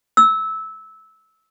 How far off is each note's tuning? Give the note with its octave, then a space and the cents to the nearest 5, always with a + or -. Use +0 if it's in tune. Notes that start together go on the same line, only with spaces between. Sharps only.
E6 -15